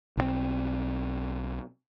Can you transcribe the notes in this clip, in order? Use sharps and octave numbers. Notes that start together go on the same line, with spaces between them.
B1 F3 C4